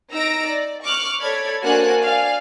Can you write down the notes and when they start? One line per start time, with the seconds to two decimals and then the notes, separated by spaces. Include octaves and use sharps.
0.11 D#4 A#5 E6 A#6 D7
0.47 D5
0.83 C#6 D6 F6 F#6
1.21 A4 C#5 D5 B5 G#6
1.62 A#3 D4 F#4 C5 G#5 F#6
2.01 D5 F5 G#5